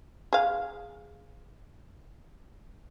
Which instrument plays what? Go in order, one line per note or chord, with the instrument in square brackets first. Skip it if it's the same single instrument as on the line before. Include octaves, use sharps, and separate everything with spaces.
[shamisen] G#4 F5